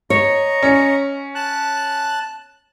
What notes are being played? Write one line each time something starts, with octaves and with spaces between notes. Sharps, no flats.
C#5 D#5 A#5 C#6
C#4
A5 F#6